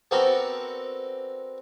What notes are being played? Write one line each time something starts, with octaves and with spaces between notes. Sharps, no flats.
B3 C4 D4 F#4 A4 A#4